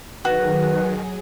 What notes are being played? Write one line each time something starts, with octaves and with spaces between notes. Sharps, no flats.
D#3 F#3 F#4 G#4 B4